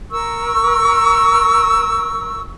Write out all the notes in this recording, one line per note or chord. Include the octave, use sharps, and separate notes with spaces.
A#4 C#6 E6